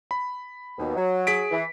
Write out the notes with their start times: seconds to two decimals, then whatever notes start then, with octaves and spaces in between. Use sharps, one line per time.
0.11 B5
0.78 D#2 B2
0.96 F#3
1.27 G#4 B6 D7
1.50 E3